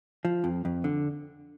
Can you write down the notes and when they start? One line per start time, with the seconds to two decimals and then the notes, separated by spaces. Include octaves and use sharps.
0.25 F3
0.44 F2
0.65 F2
0.84 D3